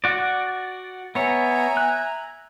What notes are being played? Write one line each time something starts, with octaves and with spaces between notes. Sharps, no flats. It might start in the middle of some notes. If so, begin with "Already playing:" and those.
F#4 D5
B3 C#5 E5 G#5 A#5
F#6